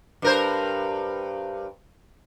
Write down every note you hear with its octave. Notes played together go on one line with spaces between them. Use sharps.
G2 A#4 C5